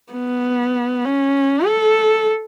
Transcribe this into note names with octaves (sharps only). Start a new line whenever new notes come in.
B3
C#4
A4